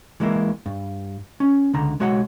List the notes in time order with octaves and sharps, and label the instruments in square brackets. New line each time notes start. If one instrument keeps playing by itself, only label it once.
[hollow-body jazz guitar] E3 G#3 A#3 E4
G2
C#4
C#2 D3 A#5
B1 G#3 F#4 C#5 E5 F#5